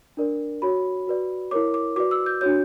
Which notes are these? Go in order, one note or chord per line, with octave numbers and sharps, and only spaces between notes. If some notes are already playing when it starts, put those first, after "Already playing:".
D4 A#4 D5
F#4 C#5 B5
F#4 B4 D5
E4 A#4 C#5 D6
D6
F#4 B4 D5 D6
E6
G6
D4 F#4 C#5 G6